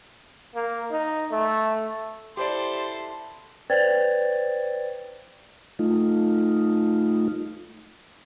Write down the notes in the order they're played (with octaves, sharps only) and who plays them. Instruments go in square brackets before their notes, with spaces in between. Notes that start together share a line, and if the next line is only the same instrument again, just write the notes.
[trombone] A#3
D#4
A3
[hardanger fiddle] E4 A4 [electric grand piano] G4 C5 D5 [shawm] C6
[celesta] B4 C5 D5 G5 G#6 A6
[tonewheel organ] A3 D#4 F4